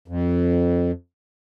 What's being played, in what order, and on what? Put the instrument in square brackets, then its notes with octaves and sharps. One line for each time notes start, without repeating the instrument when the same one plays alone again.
[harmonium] F2